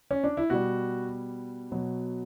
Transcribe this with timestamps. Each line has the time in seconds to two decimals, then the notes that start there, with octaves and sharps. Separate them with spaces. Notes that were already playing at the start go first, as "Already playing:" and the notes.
0.11 C#4
0.24 D4
0.37 E4
0.50 B2 G3 F#4
1.72 B2 F#3